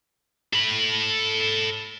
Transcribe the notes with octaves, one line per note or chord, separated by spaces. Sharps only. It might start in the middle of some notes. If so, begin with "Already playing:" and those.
A4 B5